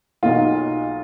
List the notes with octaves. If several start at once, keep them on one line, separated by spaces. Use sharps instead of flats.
B1 B2 A#3 D#4 F4 F#4